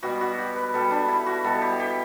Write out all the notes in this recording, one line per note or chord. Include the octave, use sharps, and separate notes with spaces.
B2 G3 F#4
F#4
G4
B4
B2 G3 A4
D4
E4
F#4
B2 G3 A4
G4
G4